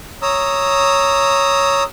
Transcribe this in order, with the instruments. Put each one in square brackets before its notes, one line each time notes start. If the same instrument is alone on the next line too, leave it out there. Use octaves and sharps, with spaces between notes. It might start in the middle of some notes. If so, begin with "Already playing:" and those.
[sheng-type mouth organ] C#5 A#5 D#6 E6